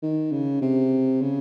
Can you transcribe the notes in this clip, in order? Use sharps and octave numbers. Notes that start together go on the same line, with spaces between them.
D#3
C#3
C3
C#3